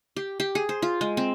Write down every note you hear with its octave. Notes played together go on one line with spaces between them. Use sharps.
G4
G4
G#4
C5
F4
G#3
C4